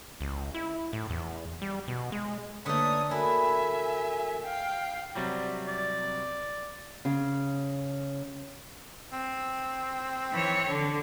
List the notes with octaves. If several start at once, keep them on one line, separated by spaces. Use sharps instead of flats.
C#2
E4
A2
E2
G3
B2
G#3
D3 A3 A#3 B4 C#5 C#6 D#6
E4 F#4 A4 A#4 E5 G#5
F5 G5
C3 F#3 G3 D5
D5
C#3
C4
E3 C#5
D3